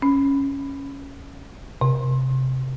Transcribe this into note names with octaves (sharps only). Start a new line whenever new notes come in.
C#4
C3